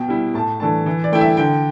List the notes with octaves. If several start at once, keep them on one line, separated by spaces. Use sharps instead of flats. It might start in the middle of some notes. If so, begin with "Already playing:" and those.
Already playing: B2 G5
G3 E4
A2 A5
E3 A3 D4 A5
E3
D5
A3 E4 G5
E5
D3 G5